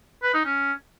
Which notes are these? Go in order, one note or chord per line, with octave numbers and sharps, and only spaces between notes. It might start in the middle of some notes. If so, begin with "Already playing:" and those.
B4
D#4
C#4